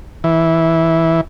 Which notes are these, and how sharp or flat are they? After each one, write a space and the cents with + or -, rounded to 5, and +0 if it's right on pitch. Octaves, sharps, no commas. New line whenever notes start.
E3 -10